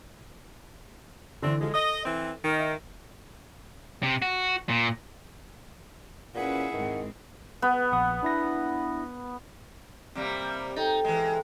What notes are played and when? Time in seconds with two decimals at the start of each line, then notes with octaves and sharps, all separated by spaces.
1.42 D3 E3 A3 C4 D4
1.61 F3 G#3 A4
1.74 D#5
2.05 E3 C4
2.44 D#3
2.60 E5
4.03 C3
4.22 F#4
4.69 A#2
6.35 A#2 C#4 E4 G#4 B4 F#5
6.72 G#2 D#3 G#3 C4
7.62 B3 B4
7.92 A#1 F#5 D#6
8.23 D4 E4 A#6
10.15 C3 G3 A#3 G4 D6
10.76 D#4 A4 G5 A#5
11.05 E3 G#3